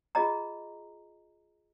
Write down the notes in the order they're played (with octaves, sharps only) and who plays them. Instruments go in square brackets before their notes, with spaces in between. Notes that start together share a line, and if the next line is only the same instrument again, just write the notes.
[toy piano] F4 G#4 D#5 A#5